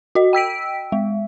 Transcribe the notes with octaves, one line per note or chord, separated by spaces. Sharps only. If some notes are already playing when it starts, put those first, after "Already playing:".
F#4 D#5
G5 E6 B6 D7
G#3